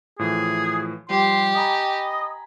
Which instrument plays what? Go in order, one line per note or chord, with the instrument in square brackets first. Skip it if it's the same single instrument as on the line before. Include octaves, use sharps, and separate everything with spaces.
[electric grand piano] A2 E3 F3 [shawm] G#4
[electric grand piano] F3 G3 [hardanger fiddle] G4 [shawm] C6
[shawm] D#5 [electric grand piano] G#5 A#5 B5